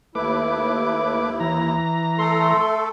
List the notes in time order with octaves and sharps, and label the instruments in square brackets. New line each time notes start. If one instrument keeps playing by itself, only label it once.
[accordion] D#2 E4 [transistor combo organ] A3 B4 D6
[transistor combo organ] E3 A#5
[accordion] A3 A4 [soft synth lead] C6